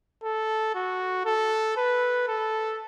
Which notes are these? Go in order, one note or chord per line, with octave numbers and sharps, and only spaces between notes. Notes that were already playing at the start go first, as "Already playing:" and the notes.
A4
F#4
A4
B4
A4